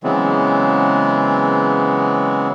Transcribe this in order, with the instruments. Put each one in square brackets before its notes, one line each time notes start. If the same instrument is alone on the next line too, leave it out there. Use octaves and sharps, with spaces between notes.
[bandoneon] C#3 E3 F#3 G#3 B3 C4